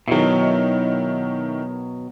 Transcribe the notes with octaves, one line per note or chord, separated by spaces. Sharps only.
B2 D#3 F#3 E4